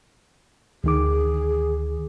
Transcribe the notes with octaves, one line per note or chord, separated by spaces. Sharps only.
D2 D#3 G#4 D6